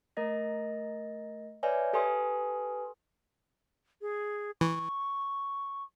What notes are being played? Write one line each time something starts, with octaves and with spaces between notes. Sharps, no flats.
A3 A#4 D#5 A#6
B4 C#5 D5 E5 G#5
G4 A4 B4 G#5 C6 D#6
G#4
E3 C#6